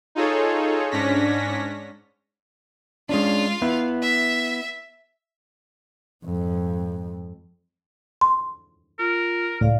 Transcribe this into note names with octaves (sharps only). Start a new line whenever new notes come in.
D#4 F4 G#4 A4 C#5
G#2 C#4 D4 C#5 A#6 B6
G#3 C#4 D4 F4 F5
B3 E4
E5
F2 G#2
C6
F4 A#4
C#2 A2 D5 F5